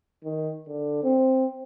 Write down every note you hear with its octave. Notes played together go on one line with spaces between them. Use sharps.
D#3
D3
C4